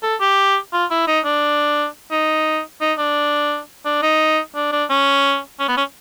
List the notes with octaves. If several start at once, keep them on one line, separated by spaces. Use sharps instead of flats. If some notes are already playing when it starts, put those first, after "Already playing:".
A4
G4
F4
E4
D#4
D4
D#4
D#4
D4
D4
D#4
D4
D4
C#4
C#4
B3
C#4